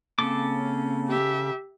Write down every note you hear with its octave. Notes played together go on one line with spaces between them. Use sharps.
C#3 A#3 C4 A4 D6
C#4
G4 E5